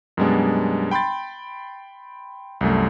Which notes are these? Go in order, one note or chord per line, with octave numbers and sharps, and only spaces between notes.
F#2 B2 G3 G#3 B3 D4
G5 B5 C6 G6 A6
C2 F#2 A3